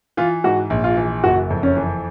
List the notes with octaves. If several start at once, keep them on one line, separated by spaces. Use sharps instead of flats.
E3 F4
G#2 F#4
A#1
F4
E3
F#1 F#4
F2
C#4
E3